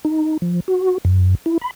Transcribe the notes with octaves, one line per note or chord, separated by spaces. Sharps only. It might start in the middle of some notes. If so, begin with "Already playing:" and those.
D#4
F3
F#4
F#2
E4
B5